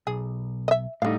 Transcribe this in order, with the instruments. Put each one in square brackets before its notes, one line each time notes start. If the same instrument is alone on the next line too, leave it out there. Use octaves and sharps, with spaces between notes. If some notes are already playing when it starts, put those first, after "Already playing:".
[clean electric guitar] B1 [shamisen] G#4
[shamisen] D#5 E5
[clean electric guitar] A2 G3 D#4 [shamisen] D3 F5